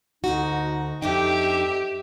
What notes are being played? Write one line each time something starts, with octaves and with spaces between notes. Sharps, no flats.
D2 D#4 F#4
F2 D4 D#4 G4 E5 G5